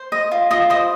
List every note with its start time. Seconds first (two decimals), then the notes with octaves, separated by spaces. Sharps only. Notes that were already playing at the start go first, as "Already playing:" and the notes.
Already playing: C5
0.12 D#5
0.31 F4
0.51 F4 D#5
0.70 C5 D#5